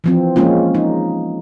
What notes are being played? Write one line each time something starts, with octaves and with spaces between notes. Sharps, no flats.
E3 F3 C4
F3 G#3 A#3 C#4 F4
D#4